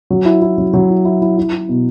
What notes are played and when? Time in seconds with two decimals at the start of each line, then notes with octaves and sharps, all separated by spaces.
0.10 F#3
0.25 E4
0.42 E4
0.58 F#3
0.74 F#3
0.90 E4
1.05 E4
1.22 E4
1.38 E4
1.53 E4
1.69 B2